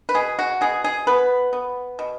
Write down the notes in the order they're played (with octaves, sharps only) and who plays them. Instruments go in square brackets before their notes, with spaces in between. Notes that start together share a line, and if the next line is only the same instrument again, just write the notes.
[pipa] B4
B2 G#4
F#4
B2 G#4
G#4
B3 B4
B3
B2